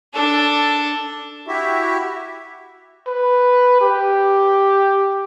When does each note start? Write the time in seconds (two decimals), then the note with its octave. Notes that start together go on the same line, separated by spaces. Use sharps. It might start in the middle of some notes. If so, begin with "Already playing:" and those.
0.14 D4 A4
1.48 E4 F#4 G4 E5
3.07 B4
3.81 G4